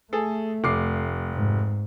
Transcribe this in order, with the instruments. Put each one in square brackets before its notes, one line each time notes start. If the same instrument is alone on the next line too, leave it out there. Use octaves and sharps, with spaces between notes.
[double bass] A3 [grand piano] G#4 A4
[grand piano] F1 D6 C7
[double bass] G#2